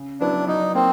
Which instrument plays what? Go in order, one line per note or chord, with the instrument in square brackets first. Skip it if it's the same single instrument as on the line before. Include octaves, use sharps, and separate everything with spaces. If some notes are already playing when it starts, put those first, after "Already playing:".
Already playing: [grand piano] C#3
[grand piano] F#3 B3 E4 [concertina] D4
[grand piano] F#3 [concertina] D#4
[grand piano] A#3 [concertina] C4